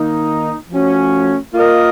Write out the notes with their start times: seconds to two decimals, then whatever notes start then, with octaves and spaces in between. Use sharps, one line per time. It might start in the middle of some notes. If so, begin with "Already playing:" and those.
Already playing: D#3 A#3 D#4
0.69 F3 A3 C#4 F#4
1.54 A#3 F4 A#4 D#5